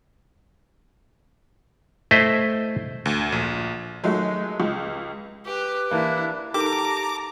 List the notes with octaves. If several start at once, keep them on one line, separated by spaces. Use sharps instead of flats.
A3 E4 C5 D#5
D2
A#1
D#3 F#3 G#3 A3
C#2
G4 B4
E3 A#3 D4 E4
D#4 G4 A4 A#4 A5 A#5 D6